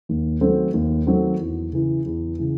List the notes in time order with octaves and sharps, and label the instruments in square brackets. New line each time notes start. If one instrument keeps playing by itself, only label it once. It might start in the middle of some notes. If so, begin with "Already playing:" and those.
[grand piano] D#2
D#3 F#3 A3 C4
D#2
D#3 F#3 A3 C4
E2
C#3 E3
E2
C#3 E3